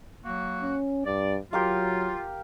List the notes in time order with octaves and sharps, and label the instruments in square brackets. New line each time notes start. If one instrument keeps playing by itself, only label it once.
[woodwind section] F#3 A#3 F#4
[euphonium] C#4
[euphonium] G2 [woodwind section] D5
[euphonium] F#3 [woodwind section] F4 [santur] G4 A#4 F5